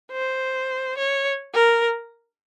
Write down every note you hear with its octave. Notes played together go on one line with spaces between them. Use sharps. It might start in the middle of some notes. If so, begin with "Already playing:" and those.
C5
C#5
A#4